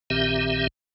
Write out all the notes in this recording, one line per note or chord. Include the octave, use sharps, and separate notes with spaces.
A#1 A#2 D#3 C4 G4 E5